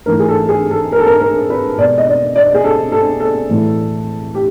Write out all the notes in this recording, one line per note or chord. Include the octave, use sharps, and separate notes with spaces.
G#2 E3 A3 A#4
G#4
A4
G#4
A4
A#4
A4
A#4
A#4
B4
B2 G#3 D5
D#5
D5
D5
G#4
A4
A4
A4
A2 E3 A3
G4